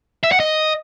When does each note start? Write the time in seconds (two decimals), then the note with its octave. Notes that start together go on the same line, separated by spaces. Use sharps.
0.24 E5
0.32 F#5
0.40 D#5